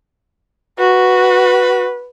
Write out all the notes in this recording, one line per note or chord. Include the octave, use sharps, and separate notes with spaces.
F#4 B4